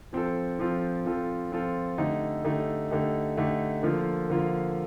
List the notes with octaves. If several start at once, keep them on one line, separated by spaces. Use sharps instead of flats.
F3 C4 F4 A4
F3 C4 F4 A4
F3 C4 F4 A4
F3 C4 F4 A4
D3 A3 D#4 G4
D3 A3 D#4 G4
D3 A3 D#4 G4
D3 A3 D#4 G4
D3 F3 A#3 F4
D3 F3 A#3 F4